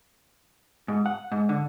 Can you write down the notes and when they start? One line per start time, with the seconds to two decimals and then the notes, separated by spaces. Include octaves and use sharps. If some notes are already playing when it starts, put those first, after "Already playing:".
0.88 G#2
1.06 F#5
1.32 G#2
1.49 D3